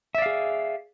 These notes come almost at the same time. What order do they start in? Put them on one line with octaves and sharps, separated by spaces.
E5 D5 F5 G#4